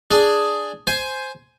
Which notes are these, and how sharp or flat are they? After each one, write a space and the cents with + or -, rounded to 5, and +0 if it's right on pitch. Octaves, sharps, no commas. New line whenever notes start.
D4 +0 G#4 +0
C5 +0 G#5 +10